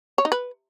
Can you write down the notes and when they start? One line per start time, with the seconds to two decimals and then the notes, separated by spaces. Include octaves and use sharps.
0.18 C#5
0.25 D#4
0.32 B4